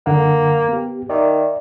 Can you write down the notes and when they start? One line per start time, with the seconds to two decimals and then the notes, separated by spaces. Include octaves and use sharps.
0.06 F#2 D3 A#3 F#5
0.68 B3 G4
1.09 D#3 D5 E5